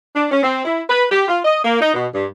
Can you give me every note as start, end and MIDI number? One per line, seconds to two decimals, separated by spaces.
0.16 0.29 62
0.31 0.42 61
0.43 0.65 60
0.65 0.82 64
0.90 1.04 71
1.11 1.26 67
1.28 1.39 65
1.45 1.60 75
1.64 1.80 58
1.81 1.94 63
1.94 2.07 47
2.14 2.26 43